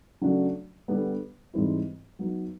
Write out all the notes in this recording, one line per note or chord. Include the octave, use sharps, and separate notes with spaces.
C#3 F#3 A3 D4 F#4
D3 G3 B3
G#2 E3 G3 C4 E4
F#3 B3 D#4